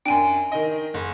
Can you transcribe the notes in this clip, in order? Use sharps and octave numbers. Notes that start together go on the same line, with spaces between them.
F#2 D4 G5 G#5
D#3 D#5
F#1